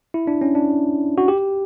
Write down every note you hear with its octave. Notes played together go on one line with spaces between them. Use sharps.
E4
D4
C#4
D4
F#4
G4